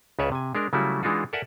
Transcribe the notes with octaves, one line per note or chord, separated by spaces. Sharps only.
C#2 C#3 B4 C#5 D5 E5
C3 G#5
G#3 D4 A#4
C#3 F#3 G3 A3 E4 F#4
E3 G#3 D4 D#4 F4 F#4
A4 A#4 D5 E5 F#5 G#5